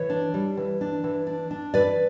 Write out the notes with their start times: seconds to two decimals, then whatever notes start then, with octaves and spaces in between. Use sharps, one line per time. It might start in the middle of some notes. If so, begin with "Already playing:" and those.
Already playing: E3 C#5
0.10 D4
0.34 G3
0.57 E3
0.81 D4
1.04 E3
1.27 D4
1.51 D4
1.74 E3 B4 D5